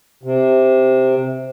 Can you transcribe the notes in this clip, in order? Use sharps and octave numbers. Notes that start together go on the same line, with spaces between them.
C3